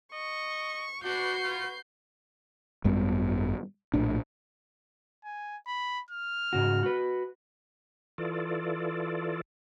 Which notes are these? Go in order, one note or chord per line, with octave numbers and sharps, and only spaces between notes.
D#5 C#6
D4 F#4 B4 G6 C7
F4
G#1 F#2 G3 B3
A#1 A2 D4
G#5
B5
F6
G#2 C#3 F#4
F#4 B4
E3 F4 A4 D5